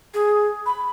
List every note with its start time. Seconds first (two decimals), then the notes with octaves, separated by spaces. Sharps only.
0.14 G#4
0.66 B5